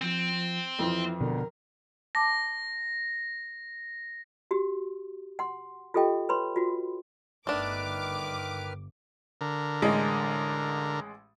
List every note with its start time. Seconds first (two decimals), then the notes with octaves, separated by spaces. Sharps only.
0.02 F3 C4
0.79 F2 E3 F3 E4
1.21 B2 D3 A#4
2.15 A5 D6 A#6
4.51 F#4 G4
5.39 F#5 C6
5.94 F4 G4 A4 D#5 G5
6.29 B4 C#5 B5 C6
6.56 F4 F#4
7.47 G1 D#3 A3 D4 B4 D6 F6
9.41 D3 A#4
9.82 A1 G#3